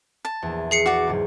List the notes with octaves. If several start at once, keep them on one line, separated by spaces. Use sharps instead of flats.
A5
A#1 E2
G#4 C7 C#7
F#4 D5
C#2 G#2 F#3